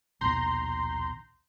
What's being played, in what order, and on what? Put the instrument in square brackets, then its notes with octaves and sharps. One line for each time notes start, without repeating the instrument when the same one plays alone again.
[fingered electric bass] A#1 D#2 B2 [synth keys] A#5 C6 G6